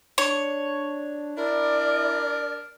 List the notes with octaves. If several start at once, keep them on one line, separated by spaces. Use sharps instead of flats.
D4 C#5
D4 E4 A#4 D5